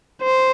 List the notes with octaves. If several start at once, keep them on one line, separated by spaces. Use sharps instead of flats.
C5